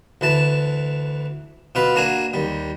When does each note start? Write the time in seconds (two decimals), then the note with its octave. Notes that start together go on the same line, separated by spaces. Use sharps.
0.21 D2 E3 A5
1.75 B2 F4 B4
1.96 A#3 D4 F#4 G#5
2.34 D#2 G3